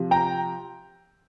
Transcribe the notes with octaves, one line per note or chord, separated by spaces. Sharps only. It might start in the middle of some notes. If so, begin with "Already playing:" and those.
Already playing: C3 F3
G5 A#5